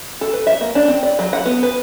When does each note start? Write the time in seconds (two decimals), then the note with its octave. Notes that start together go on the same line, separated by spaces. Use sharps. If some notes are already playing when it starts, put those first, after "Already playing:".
0.21 A4
0.33 B4
0.47 E5
0.61 A#3
0.75 D4
0.88 C4
1.03 D5
1.19 F#3
1.33 F#5
1.46 B3
1.63 B4